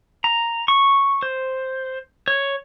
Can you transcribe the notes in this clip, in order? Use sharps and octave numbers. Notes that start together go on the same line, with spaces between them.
A#5
C#6
C5
C#5